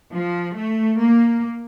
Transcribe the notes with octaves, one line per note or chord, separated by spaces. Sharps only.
F3
A3
A#3